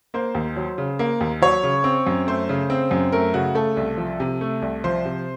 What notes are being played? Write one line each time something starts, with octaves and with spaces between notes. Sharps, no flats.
A#3 C5
D#2
F#3
C#3
A#3
D#2
F#3 C#5
C#3
C4
F#2
A3 C5
C#3
C4
F#2
A3 A#4
C#3 F#4
A3 A4
C2
F3
C3
A3
C2
F3 C5
C3